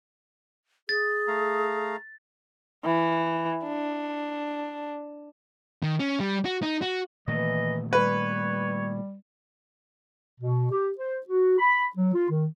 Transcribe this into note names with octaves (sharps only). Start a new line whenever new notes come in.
G#4 A6
A3 F5 A#5
E3
D4
D#3
C#4
G3
F#4
D#4
F#4
A#2 D#3 E3 A3 D#5
G3 B4 C#5
B2
G4
C5
F#4
B5
F#3
F4
D#3